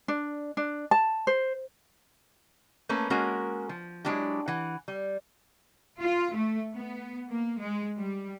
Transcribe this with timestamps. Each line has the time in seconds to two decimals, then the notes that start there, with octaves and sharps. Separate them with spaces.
0.08 D4
0.57 D4
0.91 A5
1.27 C5
2.89 A3 A#3 C#4 B4
3.10 G#3 A#3 C#4 F#4 A#4
3.69 F3
4.05 F#3 G#3 D4 E4 G4
4.48 E3 F#5
4.88 G3
6.01 F4
6.34 A3
6.74 B3
7.31 A#3
7.61 G#3
7.98 G3